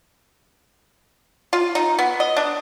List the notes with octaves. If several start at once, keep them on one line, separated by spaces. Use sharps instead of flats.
F4
D#4
B3
D#5
D4